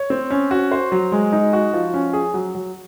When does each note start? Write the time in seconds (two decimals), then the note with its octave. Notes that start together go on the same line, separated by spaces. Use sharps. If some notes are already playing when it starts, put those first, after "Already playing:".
Already playing: C#5
0.10 C4
0.30 C#4
0.51 F#4
0.72 C5
0.92 F#3
1.12 G#3
1.32 D#4
1.53 F#4
1.74 F3
1.94 C#4
2.13 G#4
2.34 F#3
2.55 F#3